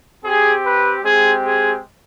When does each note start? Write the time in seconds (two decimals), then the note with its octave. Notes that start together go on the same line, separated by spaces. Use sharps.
0.24 C4 G4 G#4
0.64 B4
1.03 G#3 C4 G4 G#4
1.43 G#4